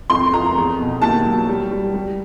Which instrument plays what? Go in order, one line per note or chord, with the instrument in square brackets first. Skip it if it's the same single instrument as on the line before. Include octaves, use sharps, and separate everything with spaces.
[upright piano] F2 C6
F2 A#5
E2
B2
D#2 A5
F#3
G3
G3
G3